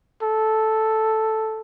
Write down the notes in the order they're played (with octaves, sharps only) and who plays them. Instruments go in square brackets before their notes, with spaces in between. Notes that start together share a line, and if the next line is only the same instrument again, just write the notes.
[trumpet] A4